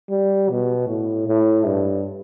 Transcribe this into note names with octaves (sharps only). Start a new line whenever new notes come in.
G3
B2
A2
A2
G2